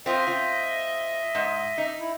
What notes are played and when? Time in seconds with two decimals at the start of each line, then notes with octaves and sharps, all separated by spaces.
0.06 C4 F4 D#5 E5
0.27 C4 F4
1.35 G#2
1.78 D#4
2.00 E4